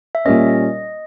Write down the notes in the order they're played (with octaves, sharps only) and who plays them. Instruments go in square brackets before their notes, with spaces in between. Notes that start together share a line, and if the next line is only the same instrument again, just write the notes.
[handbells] E5
[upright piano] A#2 G3 A#3 C#4 [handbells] D#5